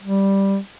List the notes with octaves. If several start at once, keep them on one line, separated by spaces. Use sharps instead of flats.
G3